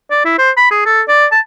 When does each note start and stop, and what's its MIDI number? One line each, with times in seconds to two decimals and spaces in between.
0.11 0.23 74
0.25 0.34 64
0.39 0.51 72
0.57 0.70 83
0.71 0.85 68
0.86 1.02 69
1.08 1.26 74
1.32 1.40 81